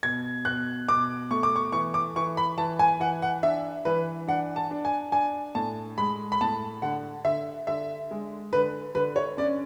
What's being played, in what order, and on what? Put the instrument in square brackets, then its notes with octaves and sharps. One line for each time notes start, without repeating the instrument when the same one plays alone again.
[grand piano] B2 G#6
B2 F#6
B2 D6
A3 C#6
D6
C#6
E3 C#6
D6
E3 C#6
B5
E3 A5
G#5
E3 F#5
F#5
D4 E5
E3 B4
D4 F#5
A5
D4
G#5
D4 G#5
A2 A5
G#3 B5
B5
A2 A5
D3 F#5
D3 E5
D3 E5
G#3
D3 B4
D3 B4
C#5
C#4 D5